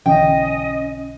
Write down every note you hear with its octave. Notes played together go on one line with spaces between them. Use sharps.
B1 D3 E3 C#4 D#5 G5